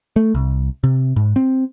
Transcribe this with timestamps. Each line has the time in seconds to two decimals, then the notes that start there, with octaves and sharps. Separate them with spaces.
0.16 A3
0.35 C2
0.84 C3
1.16 G#2
1.36 C4